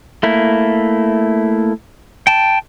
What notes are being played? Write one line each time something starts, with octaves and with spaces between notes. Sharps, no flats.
A3 A#3 E4
G5 A5